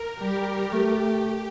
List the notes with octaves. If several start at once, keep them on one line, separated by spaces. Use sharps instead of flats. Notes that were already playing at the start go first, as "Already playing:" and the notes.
Already playing: A#4
G3 G4
A3 G4